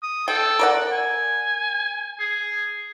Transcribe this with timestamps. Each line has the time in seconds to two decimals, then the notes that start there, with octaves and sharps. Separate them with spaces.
0.03 D#6
0.28 A4 G5
0.59 A#4 D5 F#5
0.92 G#5
2.19 G#4